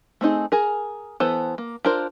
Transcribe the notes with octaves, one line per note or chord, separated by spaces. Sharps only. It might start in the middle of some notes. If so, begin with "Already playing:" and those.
A3 C4 D#4 G#4
G#4 A#4
E3 B3 A4 C5 A5
A#3
D4 F4 A#4 C5